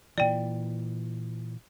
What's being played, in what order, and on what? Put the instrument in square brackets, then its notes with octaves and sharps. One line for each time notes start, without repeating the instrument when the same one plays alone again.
[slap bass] A#2 E3 [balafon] D5 G5